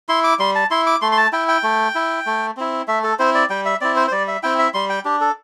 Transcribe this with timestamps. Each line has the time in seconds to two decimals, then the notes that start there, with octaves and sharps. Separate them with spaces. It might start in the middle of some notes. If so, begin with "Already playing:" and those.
0.09 E4 C6
0.24 D6
0.39 G3 C6
0.55 A5
0.71 E4 C6
0.86 D6
1.02 A3 C6
1.12 C6
1.17 A5
1.33 E4 G5
1.48 G5
1.63 A3
1.95 E4
2.26 A3
2.57 C4 E4
2.88 A3 E5
3.04 A4
3.19 C4 E4 C5
3.35 D5
3.50 G3 G5
3.66 E5
3.81 C4 E4 D5
3.96 C5
4.08 C5
4.12 G3 D5
4.28 E5
4.43 C4 E4 G5
4.59 E5
4.74 G3 C6
4.89 G5
5.05 D4 G4
5.21 A4